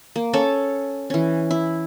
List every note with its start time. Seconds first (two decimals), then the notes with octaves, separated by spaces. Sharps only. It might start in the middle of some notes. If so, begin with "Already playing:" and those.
0.16 A#3
0.33 C#4 A4 C#5 A5
1.10 E3 C#4
1.51 E4